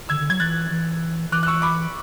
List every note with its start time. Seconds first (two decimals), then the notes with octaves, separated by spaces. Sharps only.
0.09 D3 E6 G#6
0.20 D3
0.30 F#3 G#6
0.40 E3 F#6 A6
0.71 E3
1.32 E3 D6 F#6
1.43 F#6
1.47 C#6 E6
1.62 B5 D6